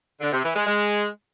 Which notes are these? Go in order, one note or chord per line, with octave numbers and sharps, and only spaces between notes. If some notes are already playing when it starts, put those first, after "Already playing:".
D3
C3
E3
G#3
G#3